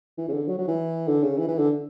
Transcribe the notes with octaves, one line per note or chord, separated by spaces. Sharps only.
E3
C#3
D3
F#3
F#3
E3
D3
C#3
E3
E3
D3